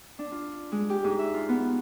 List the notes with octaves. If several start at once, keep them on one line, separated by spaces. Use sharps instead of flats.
D4
F4
G#3
G4
G#2
E5
F4
B3